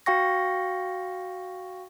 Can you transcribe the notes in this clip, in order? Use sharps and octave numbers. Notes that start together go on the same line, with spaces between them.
F#4 F5 G5 C#6 A#6